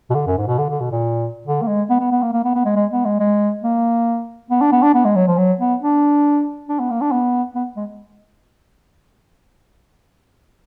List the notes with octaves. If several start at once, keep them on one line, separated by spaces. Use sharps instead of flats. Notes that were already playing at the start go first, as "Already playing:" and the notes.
B2
D3
F#2
G#2
B2
D3
D3
B2
A#2
D3
A#3
G#3
B3
B3
B3
A#3
A#3
B3
B3
G#3
G#3
B3
G#3
G#3
A#3
B3
D4
B3
D4
B3
G#3
F#3
F3
F#3
B3
D4
D4
B3
A#3
D4
B3
B3
G#3